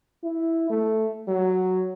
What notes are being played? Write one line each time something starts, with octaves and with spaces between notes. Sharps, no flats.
E4
A3
F#3